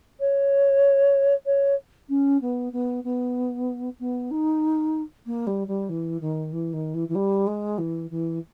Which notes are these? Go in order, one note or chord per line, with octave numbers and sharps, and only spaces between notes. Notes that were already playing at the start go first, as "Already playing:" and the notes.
C#5
C#5
C#4
B3
B3
B3
B3
D#4
A#3
G3
G3
E3
D#3
E3
D#3
E3
E3
G3
G#3
E3
E3